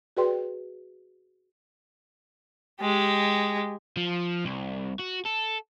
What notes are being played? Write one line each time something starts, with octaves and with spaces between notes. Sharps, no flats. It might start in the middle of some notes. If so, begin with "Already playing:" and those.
F#4 G#4 B4 D5 G5 C6
G#3 G4
F3
C2
F#4
A4